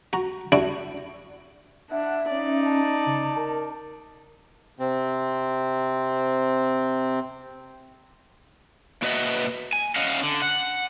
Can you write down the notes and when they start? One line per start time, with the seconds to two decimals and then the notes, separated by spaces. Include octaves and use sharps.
0.13 F#4 A#5
0.52 G3 D4 E4 F#4
1.91 D4 E5 F#5
2.30 C#4 D#4 D5
2.64 A5
3.06 C#3
3.36 A#4
4.79 C3 C4
9.02 A#3 F#4 B4 D#5 E5 F#5
9.73 G#5
9.96 C#4 D#5 F5 F#5
10.23 D3
10.42 F#5